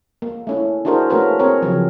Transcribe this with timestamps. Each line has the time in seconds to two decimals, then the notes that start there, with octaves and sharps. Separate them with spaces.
0.22 A#3
0.47 A3 C#4 E4
0.85 D4 E4 F#4 G#4 A#4 C5
1.10 A3 A#3 C#4 F#4 A#4 B4
1.39 C4 G#4 A#4 C#5
1.62 C#3 F3 F#3